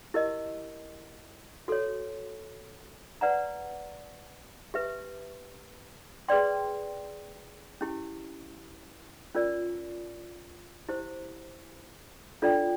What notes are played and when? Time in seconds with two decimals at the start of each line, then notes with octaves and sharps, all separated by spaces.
0.14 E4 G4 A#4 D#5
1.68 F#4 A4 C#5
3.21 B4 D5 F#5 A#5
4.74 G4 B4 E5
6.28 G#4 B4 D5 G5 C6
7.81 C#4 E4 G4
9.35 C#4 F4 A#4 D5
10.89 E4 G4 C5
12.42 D4 F4 A4 D5 G5